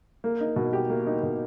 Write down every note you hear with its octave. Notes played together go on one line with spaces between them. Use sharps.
A#3
D#4
B2
G4
A#3
D#4
B2